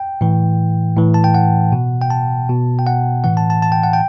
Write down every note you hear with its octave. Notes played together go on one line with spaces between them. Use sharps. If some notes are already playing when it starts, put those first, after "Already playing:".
Already playing: G5
A2 E3
A2 E3
A5
G5
F#5
B2
G5
A5
B2
G5
F#5
A2 E3 F#5
A5
A5
A5
G5
F#5
G5